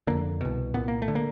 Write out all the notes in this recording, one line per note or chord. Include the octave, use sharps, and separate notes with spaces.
F2 D3 A#3
C2 B2
C2 A#2 B3
A#3
A3
D3
A#3